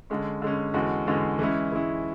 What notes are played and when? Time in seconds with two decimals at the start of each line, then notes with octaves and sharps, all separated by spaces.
0.10 D3 G#3 C#4
0.42 D3 G#3 C#4
0.74 E2 D3 G#3 C#4 F#4
1.07 E2 D3 G#3 C#4 F#4
1.39 E3 G#3 C#4 E4
1.72 E3 G#3 C#4 E4